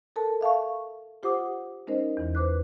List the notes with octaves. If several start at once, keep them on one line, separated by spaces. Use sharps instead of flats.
A4 A#4 A5
E5 F5 A5 C#6
F4 G4 C5 F#5 D6 D#6
G#3 C#4 D#4 A#4 C5 D#5
E2 E3
B4 C5 D6 F#6